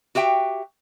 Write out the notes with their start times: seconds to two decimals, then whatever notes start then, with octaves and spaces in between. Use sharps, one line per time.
0.15 F#4 G4 E5 G5